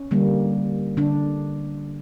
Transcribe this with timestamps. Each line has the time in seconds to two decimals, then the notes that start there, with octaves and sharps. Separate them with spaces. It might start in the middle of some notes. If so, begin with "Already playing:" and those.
Already playing: C#4
0.11 D3 G3 A#3
0.97 D3 D4